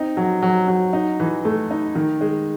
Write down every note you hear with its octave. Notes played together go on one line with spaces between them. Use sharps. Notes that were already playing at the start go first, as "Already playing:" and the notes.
Already playing: C4 D#4
F#3
F#3
F#3
D#4
E3
A3
D#4
D#3
G#3